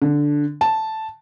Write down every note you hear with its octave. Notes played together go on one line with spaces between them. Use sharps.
D3
A5